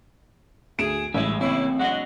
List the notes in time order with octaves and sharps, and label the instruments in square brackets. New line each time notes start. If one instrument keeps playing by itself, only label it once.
[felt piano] D2 D7 E7 [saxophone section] G#4
[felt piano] A1 [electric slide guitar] G3 G#3 [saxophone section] E4
[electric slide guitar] C#3 A#3 [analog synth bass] C4 [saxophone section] E4 C#5
[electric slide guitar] F#3 D4 D#5 [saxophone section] G#3 F#5